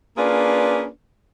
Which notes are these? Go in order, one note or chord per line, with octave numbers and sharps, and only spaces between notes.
A#3 C#4 D4 F4 G#4 B4